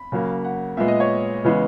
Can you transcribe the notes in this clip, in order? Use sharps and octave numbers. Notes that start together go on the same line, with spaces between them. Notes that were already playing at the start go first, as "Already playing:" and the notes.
Already playing: B5
C#3 F#3 A#3
F#5
A#2 G#3 B3 E5
D#5
C#5
C#3 E3 G#3 B3